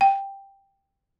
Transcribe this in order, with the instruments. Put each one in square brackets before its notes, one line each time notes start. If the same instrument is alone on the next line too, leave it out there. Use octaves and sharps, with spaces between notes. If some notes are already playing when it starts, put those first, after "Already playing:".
[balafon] G5